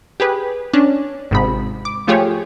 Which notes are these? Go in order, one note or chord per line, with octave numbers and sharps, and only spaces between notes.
G4 G#4 B4
C#4 D4
G#1 G#2 C3 B5
D6
F3 A3 F4 G4 G#4 C#5